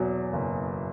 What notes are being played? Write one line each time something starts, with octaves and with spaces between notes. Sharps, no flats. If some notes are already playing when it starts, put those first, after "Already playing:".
Already playing: E2 B2 F#3
F#1